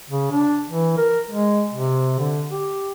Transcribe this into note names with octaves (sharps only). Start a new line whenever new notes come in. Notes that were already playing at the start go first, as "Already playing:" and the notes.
C#3
D4
E3
A#4
G#3
C3
D3
G4